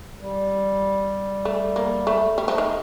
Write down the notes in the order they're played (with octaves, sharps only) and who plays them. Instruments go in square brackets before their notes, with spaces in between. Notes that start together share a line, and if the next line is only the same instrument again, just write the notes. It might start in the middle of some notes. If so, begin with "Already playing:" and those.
[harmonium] G3
[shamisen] A3
A#3
A3
[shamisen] G3 [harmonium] A3
[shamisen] F3
D#3